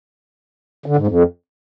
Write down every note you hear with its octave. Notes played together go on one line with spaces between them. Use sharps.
D3
G#2
F2